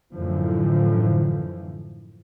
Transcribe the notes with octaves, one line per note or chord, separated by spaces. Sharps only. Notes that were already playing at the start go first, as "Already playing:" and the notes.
F#2 A2 D3 E3 F3